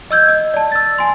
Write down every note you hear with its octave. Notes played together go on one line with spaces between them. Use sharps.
D#5 E6 G6 G#6
D#5
D5 A5
E6 A6
G#5 C6